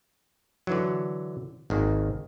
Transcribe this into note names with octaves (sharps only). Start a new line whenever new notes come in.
D3 E3 F#3
G#1 D#3 A#3